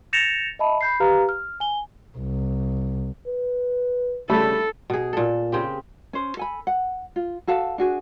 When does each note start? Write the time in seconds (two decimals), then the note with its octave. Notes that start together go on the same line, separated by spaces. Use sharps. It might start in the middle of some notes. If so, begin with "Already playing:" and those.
0.13 G6 A6 A#6 C#7 E7 F7
0.59 D#5 E5 A5 B5
0.81 B5 G6 C7
1.00 G4 B4 F5 A#5 F6
1.29 F6
1.60 G#5 G7
2.18 C2
3.28 B4
4.30 C#3 G3 A3 A4 B5
4.90 B2 G#4
5.13 A#2 A4
5.52 C#3 C4 G4
6.13 C#4 C5
6.37 A4 G#5 B5
6.67 F#5
7.16 F4
7.47 F#4 A4 F5 A5
7.78 D4 F#4 G#4